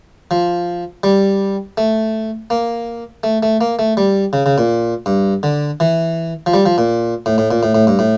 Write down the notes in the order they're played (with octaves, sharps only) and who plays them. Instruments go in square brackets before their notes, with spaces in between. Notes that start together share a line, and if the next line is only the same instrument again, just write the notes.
[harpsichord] F3
G3
A3
A#3
A3
A3
A#3
A3
G3
C#3
C#3
A#2
G2
D3
E3
F3
G3
F3
A#2
A2
A2
A#2
A2
A2
G2
A2